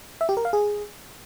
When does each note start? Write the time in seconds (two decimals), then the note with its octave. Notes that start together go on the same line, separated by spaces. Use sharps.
0.21 E5
0.29 G4
0.37 A#4
0.45 F5
0.53 G#4